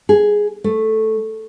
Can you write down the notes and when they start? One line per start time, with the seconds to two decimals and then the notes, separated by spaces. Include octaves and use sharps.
0.09 G#4
0.64 A3